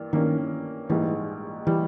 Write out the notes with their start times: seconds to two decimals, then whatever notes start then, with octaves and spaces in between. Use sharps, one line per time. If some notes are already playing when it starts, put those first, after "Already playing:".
Already playing: G2 E3 A#3
0.13 G2 D#3 E3 A#3 C#4
0.90 A#1 G#2 E3 G3
1.67 E3 G3